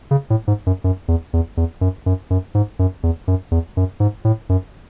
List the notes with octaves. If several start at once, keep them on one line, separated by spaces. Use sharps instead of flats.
C#3
A2
G#2
F#2
F#2
E2
E2
E2
F#2
F#2
F#2
G#2
F#2
E2
F#2
E2
F#2
G#2
A2
F#2